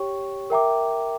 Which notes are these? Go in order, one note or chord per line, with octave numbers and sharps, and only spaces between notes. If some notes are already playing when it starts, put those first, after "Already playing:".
Already playing: G4 C#5 G5 C#6
A#4 E5 G5 A#5 D6